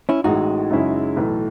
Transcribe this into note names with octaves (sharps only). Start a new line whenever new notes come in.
C#4 E4
A1 A2 G#3 D#4 F#4
F#2 C#3 G#3 C#4 E4
B1 A2 E3 A3